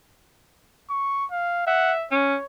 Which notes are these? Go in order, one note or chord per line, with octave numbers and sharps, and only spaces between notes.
C#6
F5
E5 F#5
C#4 C#5